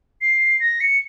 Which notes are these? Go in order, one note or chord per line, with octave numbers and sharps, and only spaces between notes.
C7
A#6
C#7